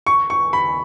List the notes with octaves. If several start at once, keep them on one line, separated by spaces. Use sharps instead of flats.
C#6
C#6
B5